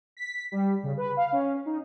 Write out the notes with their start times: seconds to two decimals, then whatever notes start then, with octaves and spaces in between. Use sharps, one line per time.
0.17 B6
0.52 G3
0.83 C#3
0.97 B4
1.17 F5
1.32 C#4
1.66 D#4